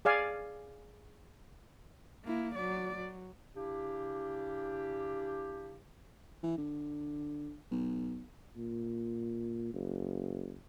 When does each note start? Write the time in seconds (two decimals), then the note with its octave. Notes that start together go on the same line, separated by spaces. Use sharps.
0.05 G#4 D5 F5 G#5
2.25 A#3 E4
2.55 F#3 D5
2.96 F#3
3.56 C#3 D4 E4 G4
6.43 E3
6.58 D3
7.71 B1
8.57 A#2
9.74 F#1